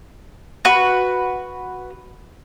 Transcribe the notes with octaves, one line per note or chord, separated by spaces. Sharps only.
F#4 B4